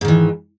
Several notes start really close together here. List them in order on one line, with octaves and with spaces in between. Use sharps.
G#2 D#3 E3